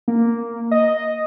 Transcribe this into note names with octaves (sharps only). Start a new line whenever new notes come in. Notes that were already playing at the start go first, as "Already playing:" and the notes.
A#3
D#5